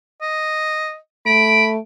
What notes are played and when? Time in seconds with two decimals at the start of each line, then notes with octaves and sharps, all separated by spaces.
0.22 D#5
1.26 A3 B5 D7